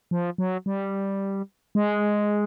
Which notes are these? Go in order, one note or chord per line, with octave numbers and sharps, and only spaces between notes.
F3
F#3
G3
G#3